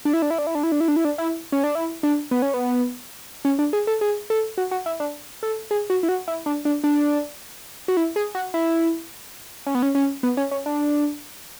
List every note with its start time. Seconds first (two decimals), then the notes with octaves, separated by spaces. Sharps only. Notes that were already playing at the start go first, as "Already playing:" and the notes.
0.05 D4
0.13 E4
0.22 D4
0.30 E4
0.38 D4
0.47 E4
0.55 D4
0.63 E4
0.72 D4
0.80 E4
0.88 D4
0.96 E4
1.05 D4
1.18 E4
1.52 C#4
1.64 D4
1.75 E4
2.03 D4
2.31 B3
2.42 C#4
2.54 B3
3.45 C#4
3.59 D4
3.73 G#4
3.87 A4
4.01 G#4
4.30 A4
4.58 F#4
4.71 F#4
4.86 E4
5.00 D4
5.43 A4
5.71 G#4
5.90 F#4
6.03 E4
6.09 F#4
6.28 E4
6.46 D4
6.65 D4
6.84 D4
7.88 F#4
7.97 E4
8.16 G#4
8.35 F#4
8.54 E4
9.66 C#4
9.75 B3
9.82 C#4
9.95 C#4
10.23 B3
10.37 C#4
10.51 C#4
10.66 D4